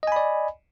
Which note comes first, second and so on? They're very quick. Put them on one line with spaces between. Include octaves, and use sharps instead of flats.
D#5 G#5 B5 D5